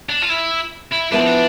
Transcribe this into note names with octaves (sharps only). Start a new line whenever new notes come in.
D4
F4
E4
E4
F3 B3 D4 E4 B4
C4
D4